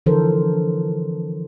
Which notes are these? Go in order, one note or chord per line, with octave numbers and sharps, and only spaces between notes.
D3 E3 F3 A4 A#4 C5